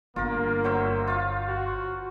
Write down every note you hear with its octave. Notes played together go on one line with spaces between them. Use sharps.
G1 A#3 F4 A#4
F#3 C5 E5
F4 F5
F#4